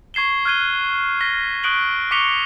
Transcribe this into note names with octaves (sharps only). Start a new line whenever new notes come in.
C#6 G#6 C7 E7 G7
F6 F#6 G#6 D#7 G7
F#6
F6 A#6 B6 G7
C#6 D#6 F#6 D7 F#7 G7
C#6 D6 B6 C#7 F7 G7